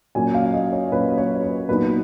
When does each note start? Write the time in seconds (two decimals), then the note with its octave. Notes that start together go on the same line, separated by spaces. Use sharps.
0.15 A#2 F#3 C#4 G#5
0.34 F5
0.53 D#5
0.72 C#5
0.92 A#2 F#3 C#4 B4
1.18 C#5
1.43 B4
1.69 A#2 F#3 B3 D#4 B4